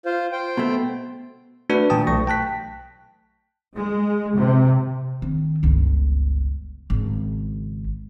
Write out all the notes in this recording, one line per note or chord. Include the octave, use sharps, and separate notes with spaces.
F4 C5
C5 G5
B2 A3
A3 D4 F#4 B4
A#2 E3 G5 A5 D#6
B1 A3 C#6 A#6
G5 A5 F#6 B6
G#3
C3
D#3 C4
G1 C#2
G#1 C#3